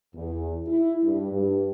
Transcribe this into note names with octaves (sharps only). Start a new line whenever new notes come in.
E2
E4
G2
G2